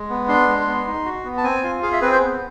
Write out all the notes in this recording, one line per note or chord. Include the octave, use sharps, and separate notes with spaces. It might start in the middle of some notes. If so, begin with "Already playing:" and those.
Already playing: G#3
B3
D4 C6
G#3
B3
D#4
F#4
B3
A5
C4 G#5
F4
G#4 F5
E5
C4 B4
C5
B3